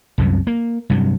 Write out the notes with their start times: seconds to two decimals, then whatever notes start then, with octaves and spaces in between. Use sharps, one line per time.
0.18 C2 F#2 C3
0.47 A#3
0.90 G2 C3 F#3